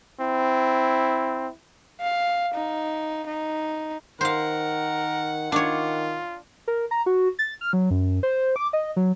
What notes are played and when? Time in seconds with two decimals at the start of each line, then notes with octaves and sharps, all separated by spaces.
0.21 C4 E4
2.01 F5
2.55 D#4
3.27 D#4
4.21 D#3 A#4 C5 F5 F#5
5.52 D#3 D4 F4 C#5
6.68 A#4
6.91 A#5
7.06 F#4
7.39 A6
7.61 F6
7.73 F#3
7.91 F#2
8.23 C5
8.56 D6
8.73 D#5
8.96 F#3